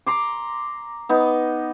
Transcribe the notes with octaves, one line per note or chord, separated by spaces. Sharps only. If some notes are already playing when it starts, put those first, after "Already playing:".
A#5 C6 D6
B3 D#4